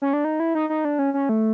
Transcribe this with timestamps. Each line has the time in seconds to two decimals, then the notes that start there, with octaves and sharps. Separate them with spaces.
0.02 C#4
0.13 D4
0.25 D#4
0.40 E4
0.55 D#4
0.70 D#4
0.85 D4
0.99 C#4
1.14 C#4
1.29 A3